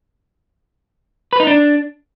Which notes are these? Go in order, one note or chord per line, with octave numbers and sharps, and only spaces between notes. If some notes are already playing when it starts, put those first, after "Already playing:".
B4
D#4
D4